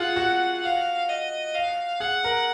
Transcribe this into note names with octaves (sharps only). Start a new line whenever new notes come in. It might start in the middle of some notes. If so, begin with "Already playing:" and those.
Already playing: F4 G#4 F#5
F#4
F5
D#5
F5
G#4 F#5
A#4